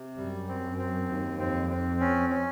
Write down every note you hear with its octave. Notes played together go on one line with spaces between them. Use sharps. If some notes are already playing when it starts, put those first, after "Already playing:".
Already playing: C3
F#2 G3
C4
C4
D#2
F2 C4
C4
C#4
C#4